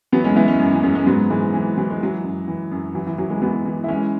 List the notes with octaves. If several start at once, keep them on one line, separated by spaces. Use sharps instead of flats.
E3 F#3 B3
G#3 C#4
E3 B3 E4
G#3 C#4
F#2
E3
F#2 G#3 C#4
G#3 C#4
G#2 F#3 B3
G#2 E3 G#3
E3
E3 F#3
G#3
E3 F#3
F#2
E3
F#2
E3 F#3
E3
E3 F#3
E3 G#3
E3 F#3 B3
E3
E4
E3 G#3 C#4